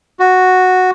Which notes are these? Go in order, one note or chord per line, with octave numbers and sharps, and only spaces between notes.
F#4